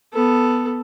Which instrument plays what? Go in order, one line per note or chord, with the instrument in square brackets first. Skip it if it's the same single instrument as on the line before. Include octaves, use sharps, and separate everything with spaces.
[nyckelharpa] B3 A4